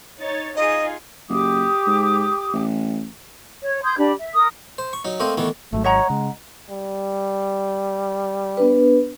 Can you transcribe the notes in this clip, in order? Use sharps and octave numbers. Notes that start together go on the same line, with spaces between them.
D#4 C#5 A6
D#4 F4 G#4 D#5
F#1 G4 D6 D#6
G#2
A1
C#5
C6 D#6 G6 G#6
D4 G4 B5
E5
A#4 D#6
C5
C#6
F#3 D#4
A3 A#3 C4 C5 D#5
D#3 E3 A3 B3
G#1 G#2 F#3 A3
C#5 D#5 F#5 A#5
C#3 G#3
G3
B3 D4 B4